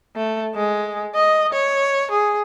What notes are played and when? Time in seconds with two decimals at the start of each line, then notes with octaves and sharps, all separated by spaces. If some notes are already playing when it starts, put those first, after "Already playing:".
0.16 A3
0.55 G#3
1.14 D#5
1.53 C#5
2.11 G#4